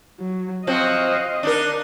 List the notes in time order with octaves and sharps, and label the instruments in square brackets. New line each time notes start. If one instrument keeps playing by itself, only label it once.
[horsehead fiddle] F#3
[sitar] F3 C4 F#4 [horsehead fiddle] D#5 F5
[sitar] D4 D#4 A#4